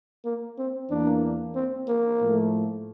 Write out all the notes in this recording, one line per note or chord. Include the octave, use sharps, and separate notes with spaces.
A#3
C4
E2 E3 A#3 D4
C4
A#3
A2 F3 A3